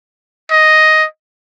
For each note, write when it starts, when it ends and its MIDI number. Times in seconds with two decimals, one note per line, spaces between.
0.51 1.05 75